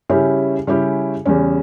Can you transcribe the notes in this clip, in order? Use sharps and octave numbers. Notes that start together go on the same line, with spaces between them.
C#3 G3 C#4 E4 G4
C#3 G3 C#4 E4 G4
E2 C#3 G3 C#4